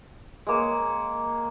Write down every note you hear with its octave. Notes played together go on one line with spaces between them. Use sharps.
G#3 A#3 C#5